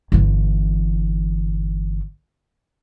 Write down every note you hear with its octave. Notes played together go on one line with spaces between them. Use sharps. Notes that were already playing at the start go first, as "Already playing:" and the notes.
G1 E3